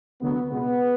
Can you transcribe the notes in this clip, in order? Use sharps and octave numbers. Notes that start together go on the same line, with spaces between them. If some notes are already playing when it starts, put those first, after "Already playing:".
D2 D3 F#3 B3
C#2 B2 G#3 B3